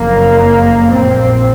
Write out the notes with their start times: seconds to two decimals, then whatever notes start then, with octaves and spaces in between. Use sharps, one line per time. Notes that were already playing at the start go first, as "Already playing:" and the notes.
Already playing: F#1 F2 C#3 A#3
0.91 A#1 A#2 C4